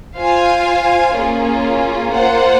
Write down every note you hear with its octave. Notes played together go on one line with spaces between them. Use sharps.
F4 C5 F5 G#5
A#3 C#4 F4 G#4
A#3 F4 C5 F#5